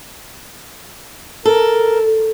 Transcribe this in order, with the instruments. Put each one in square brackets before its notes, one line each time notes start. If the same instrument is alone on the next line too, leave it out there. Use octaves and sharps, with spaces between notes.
[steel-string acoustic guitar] A4 [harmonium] A#4